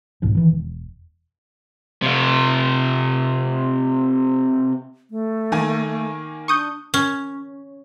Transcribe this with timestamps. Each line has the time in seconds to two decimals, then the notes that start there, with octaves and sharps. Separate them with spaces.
0.22 B1 G#2 B2 F3
0.35 D#3 E3
0.51 E1
2.02 C3 F4
5.10 A3
5.52 D#3 A#3 G#5
6.48 D4 C#6 D#6 G6
6.94 C#4